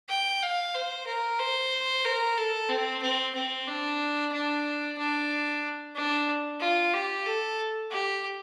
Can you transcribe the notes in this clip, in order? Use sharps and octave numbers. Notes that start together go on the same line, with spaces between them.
G5
F5
C5
A#4
C5
A#4
A4
C4
C4
C4
D4
D4
D4
D4
F4
G4
A4
G4